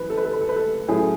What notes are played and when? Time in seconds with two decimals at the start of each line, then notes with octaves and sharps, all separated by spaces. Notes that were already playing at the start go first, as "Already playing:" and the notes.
Already playing: F#2 E3 B4
0.10 A4
0.17 B4
0.25 A4
0.33 B4
0.41 A4
0.49 B4
0.56 A4
0.88 A2 F#3 C#4 G#4